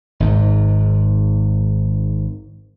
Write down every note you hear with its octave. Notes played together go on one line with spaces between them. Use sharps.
G#1 G#2